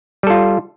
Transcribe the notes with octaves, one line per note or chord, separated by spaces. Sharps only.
G3 F4 A4